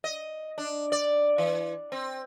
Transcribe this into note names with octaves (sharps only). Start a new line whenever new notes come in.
D#5
D4
D5
E3
C4